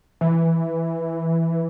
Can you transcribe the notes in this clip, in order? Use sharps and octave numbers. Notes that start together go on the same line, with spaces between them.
E3